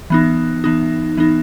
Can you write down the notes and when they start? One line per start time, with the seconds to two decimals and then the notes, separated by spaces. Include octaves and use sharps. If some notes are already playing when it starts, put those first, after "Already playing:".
0.10 E3 B3 D#4
0.64 E3 B3 D#4
1.17 E3 B3 D#4